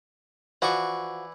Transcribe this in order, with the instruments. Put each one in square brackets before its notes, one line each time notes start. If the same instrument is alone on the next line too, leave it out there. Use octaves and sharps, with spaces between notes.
[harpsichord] E3 D5 C#6 [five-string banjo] F3 F#4